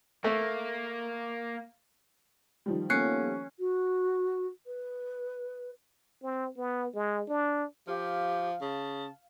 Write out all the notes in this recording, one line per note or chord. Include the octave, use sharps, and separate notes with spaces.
A3 A#3
D#3 F3 G3
A#3 B3 C#4 A4 F#6 C7 C#7
F#4
B4
C4
B3
G#3
D4
F3 G4 F5
C#3 A5